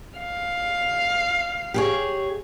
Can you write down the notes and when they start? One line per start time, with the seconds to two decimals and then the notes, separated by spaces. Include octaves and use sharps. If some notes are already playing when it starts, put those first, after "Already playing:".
0.18 F5
1.74 G4 G#4 C#5